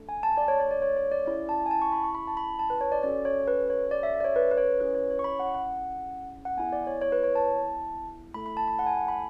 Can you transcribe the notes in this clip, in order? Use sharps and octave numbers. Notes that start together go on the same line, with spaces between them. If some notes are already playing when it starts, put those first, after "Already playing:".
Already playing: A3 D4 A4
G#5
A5
D5
C#5
C#5
D5
C#5
C#5
D5
C#4 E4 G#4 D5
A5
G#5
A5
C#6
B5
C#6
B5
A5
B5
A5
B4
C#5
D5
C#4 F#4 A4 D5
C#5
B4
C#5
D5
E5
E5
D5
C#5
B4
B4
C#5
C#4 E4 G#4 B4
C#5
C#5
C#6
B5
F#5
F#5
F#5
B3 E4 G#4 G#5
D5
C#5
C#5
B4
C#5
A5
A3 E4 A4 B5
B5
A5
B5
F#5
G#5
A5
B5